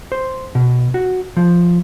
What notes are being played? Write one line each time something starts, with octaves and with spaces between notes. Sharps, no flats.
C5
B2
F#4
F3